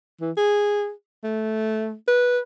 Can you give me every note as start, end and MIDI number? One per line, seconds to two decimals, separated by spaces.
0.21 0.31 52
0.37 0.91 68
1.23 1.94 57
2.08 2.39 71